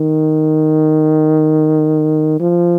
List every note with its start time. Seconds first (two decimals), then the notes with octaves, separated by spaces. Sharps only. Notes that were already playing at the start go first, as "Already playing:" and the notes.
Already playing: D#3
2.40 F3